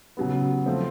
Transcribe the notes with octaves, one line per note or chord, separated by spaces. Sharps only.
C#3 F#3 B3
F3 A3 C4